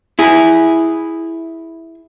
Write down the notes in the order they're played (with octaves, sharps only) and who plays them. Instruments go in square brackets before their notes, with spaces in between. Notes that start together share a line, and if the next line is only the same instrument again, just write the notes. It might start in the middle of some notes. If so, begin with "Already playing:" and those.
[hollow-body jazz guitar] E4 G#4